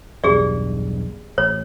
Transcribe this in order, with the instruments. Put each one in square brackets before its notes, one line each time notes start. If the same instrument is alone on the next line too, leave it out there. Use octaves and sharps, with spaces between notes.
[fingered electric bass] B1 E2 G2 [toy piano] G4 G#4 D5
[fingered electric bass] A1 [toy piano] C#5